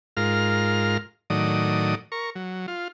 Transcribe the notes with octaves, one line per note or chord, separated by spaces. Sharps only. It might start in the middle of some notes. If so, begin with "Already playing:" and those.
G#2 F4 A#4 F6
A2 D#3 F#3 D5 D#6
A#4 C#6
F#3
F4